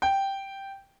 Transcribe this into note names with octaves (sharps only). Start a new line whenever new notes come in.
G5